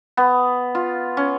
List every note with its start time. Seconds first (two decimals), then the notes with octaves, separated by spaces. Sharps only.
0.17 B3
0.75 F4
1.17 C#4